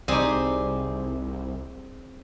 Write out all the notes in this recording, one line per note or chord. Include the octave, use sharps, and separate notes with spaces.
C2 G3 C4 D#4 G#4 G#5 D6 D#6